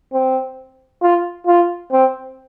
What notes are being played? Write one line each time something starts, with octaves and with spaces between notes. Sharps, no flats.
C4
F4
F4
C4